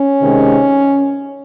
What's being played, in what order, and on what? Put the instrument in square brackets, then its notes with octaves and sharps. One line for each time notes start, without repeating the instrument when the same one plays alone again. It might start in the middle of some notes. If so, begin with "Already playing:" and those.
Already playing: [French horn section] C#4
C3 D#3 G#3